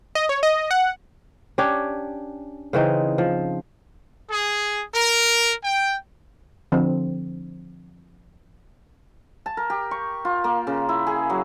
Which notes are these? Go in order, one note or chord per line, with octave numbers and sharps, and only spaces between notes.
D#5
C#5
D#5
F#5
C#4 D4 G4 C#5
C#3 E3 C4 D#4
F3
G#4
A#4
G5
D3 F3 C4
A5
A#4
G4
C#6
F4
A#3
C#3
E4
G#4
F#3